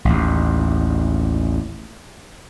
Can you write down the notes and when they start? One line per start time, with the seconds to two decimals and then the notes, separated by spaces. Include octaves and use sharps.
0.05 A1 D#2